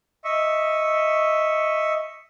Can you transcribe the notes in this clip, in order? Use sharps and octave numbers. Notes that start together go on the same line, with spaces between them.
D#5 E5 C#6